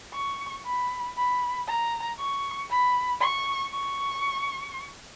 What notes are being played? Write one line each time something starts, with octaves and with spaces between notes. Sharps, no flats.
C#6
B5
B5
A#5
C#6
B5
C#6
C#6